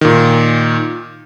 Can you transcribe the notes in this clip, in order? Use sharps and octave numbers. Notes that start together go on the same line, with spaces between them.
A#2 D#3